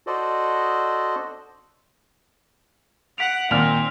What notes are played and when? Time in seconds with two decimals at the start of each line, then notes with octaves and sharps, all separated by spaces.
0.07 F#4 A4 C5 D5 D#5
3.18 F#5 B6 D7 F7
3.51 A#2 D#3 C4 F6 F7